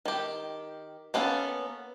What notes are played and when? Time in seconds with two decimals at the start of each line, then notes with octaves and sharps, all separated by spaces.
0.05 D#3 G4
1.14 A#3 B3 C#4 G#4 A4